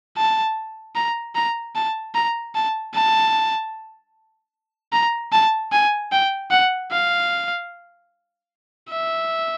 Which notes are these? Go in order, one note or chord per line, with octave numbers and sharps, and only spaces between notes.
A5
A#5
A#5
A5
A#5
A5
A5
A#5
A5
G#5
G5
F#5
F5
E5